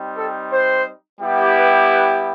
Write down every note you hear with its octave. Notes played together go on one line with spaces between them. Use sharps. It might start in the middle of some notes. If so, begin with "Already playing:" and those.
Already playing: G3 C4 D#4
A4
C5
G3 B3 E4 G4
B4
B4